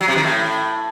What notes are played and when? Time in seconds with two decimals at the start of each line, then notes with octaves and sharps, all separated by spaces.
0.01 F#3
0.08 C3
0.16 D#3
0.23 A2